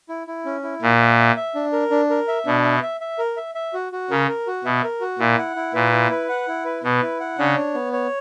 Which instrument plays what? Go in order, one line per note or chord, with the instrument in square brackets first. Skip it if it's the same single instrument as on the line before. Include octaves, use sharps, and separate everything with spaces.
[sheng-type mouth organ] E4
E4
C#4
E4
[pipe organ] A#2 [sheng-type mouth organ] A#4
[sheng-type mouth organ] E5
E5
E5
D4
A#4
D4
A#4
E5
[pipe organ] B2 [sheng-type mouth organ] D4
[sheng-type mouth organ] E5
E5
E5
A#4
E5
E5
F#4
F#4
[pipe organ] C#3 [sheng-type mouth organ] A#4
[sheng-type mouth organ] A#4
F#4
[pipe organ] B2 [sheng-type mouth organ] E5
[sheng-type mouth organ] A#4
F#4
[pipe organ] A#2 [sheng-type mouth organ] E4
[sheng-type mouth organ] F#5
E4
[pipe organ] A#2 [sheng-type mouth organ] B4
[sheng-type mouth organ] E4
B4
F#5
E4
B4
[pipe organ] B2 [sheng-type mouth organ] B4
[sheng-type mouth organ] E4
F#5
[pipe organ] C#3 [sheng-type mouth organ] D4
[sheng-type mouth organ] C#5
B3
C#5